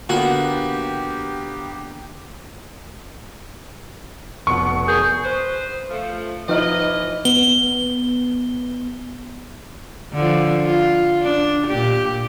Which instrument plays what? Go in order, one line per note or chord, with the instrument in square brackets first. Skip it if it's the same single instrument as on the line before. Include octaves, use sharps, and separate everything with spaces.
[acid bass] D3 [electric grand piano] A#3 B3 [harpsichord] F#4 F#5 [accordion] G4
[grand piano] F1 B2 F#5 [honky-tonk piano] C#6
[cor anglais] G#4 [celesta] A#4 G6
[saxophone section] B4 C5
F3 A3
[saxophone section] E3 D#5 [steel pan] F3 D#4 E4 [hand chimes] B4 F6
[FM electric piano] B3 [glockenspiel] G7
[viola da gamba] D3 F3
F4
D4
A#2 G4